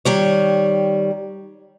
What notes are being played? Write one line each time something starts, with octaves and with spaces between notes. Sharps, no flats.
D#3 G3 C#5